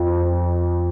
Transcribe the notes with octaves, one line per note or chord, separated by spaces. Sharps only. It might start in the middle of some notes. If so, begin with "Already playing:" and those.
Already playing: F2